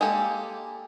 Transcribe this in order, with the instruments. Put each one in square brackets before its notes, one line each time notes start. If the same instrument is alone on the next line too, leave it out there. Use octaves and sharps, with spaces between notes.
[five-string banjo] G#3 A#3 G4 A4